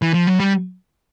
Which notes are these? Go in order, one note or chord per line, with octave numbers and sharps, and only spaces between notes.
E3
F3
F#3
G3